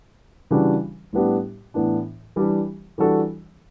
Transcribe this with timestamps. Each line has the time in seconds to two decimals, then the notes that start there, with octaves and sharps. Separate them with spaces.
0.51 C#3 E3 G3 D4 F#4
1.13 A2 G3 B3 D4 G4
1.74 A2 E3 B3 D4
2.36 E3 G3 D4 G4
2.98 E3 G3 D4 F#4 A4